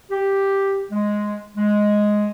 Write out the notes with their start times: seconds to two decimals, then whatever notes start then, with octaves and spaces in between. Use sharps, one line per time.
0.11 G4
0.91 G#3
1.57 G#3